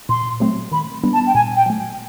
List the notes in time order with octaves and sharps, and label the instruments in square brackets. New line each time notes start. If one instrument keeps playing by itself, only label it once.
[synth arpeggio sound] A#2 [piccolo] C6
[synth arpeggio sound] F#3 A3 C4
[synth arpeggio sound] D#3 [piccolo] B5
[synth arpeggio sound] G3 B3 D4
[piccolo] A5
G5
[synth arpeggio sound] A#2 [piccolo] G#5
[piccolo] G5
[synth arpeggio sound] F#3 A3